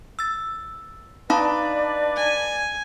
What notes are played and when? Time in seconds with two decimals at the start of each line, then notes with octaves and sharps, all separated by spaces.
0.19 E6 A6
1.30 D4 D#4 B4 D5 F5 A5 B5
2.16 G#5